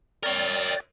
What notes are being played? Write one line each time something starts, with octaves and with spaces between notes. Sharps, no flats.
A#4 C#5 D5 G5 A6